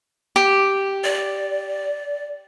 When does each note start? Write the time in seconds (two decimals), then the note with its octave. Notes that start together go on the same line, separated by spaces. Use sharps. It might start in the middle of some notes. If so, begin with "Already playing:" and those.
0.36 G4
1.04 D5